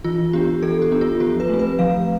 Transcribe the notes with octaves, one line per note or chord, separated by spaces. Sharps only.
E3 F4
B3 D4 G4
E3 A4
G4
B3 D4
F4
F3 G4
B4
A3 C4
B4
F3 F5